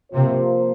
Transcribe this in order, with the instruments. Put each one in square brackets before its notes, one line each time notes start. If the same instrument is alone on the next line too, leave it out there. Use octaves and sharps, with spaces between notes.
[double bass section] C3 [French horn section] F3 A#3 F4 C5